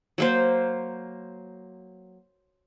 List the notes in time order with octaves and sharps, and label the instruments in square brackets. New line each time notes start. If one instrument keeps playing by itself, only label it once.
[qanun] F#3 A#3 C5